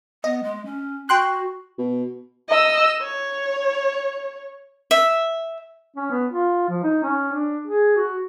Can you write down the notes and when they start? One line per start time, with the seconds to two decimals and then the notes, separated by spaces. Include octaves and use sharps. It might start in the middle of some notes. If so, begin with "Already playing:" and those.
0.24 B3 D#5
0.43 G#3
0.65 C#4
1.09 F#4 G5 C6 F#6
1.78 B2
2.49 D#5 E6
3.02 C#5
4.91 E5
5.96 C#4
6.10 B3
6.33 F4
6.69 F3
6.83 D#4
7.03 C#4
7.32 D4
7.67 G#4
7.96 F#4